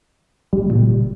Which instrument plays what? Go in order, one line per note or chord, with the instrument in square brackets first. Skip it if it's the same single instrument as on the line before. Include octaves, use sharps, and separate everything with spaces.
[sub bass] F#1 [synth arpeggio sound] G3
[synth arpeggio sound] A#2